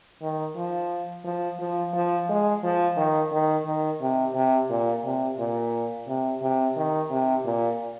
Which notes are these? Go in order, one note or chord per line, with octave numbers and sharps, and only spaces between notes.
D#3
F3
F3
F3
F3
G#3
F3
D#3
D#3
D#3
C3
C3
A#2
C3
A#2
C3
C3
D#3
C3
A#2